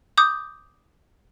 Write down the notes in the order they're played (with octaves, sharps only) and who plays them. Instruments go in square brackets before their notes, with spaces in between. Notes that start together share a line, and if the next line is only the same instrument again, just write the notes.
[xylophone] D6 D#6 G6